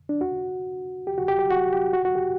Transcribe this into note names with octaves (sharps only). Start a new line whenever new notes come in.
D4
F#4
G4
F#4
G4
G4
F#4
G4
F#4
F#4
G4